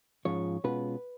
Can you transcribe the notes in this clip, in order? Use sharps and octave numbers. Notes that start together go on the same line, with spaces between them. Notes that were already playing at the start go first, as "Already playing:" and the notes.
G#2 F3 G#3 C#4 F4 C#5
B2 G#3 C#4 F4 B4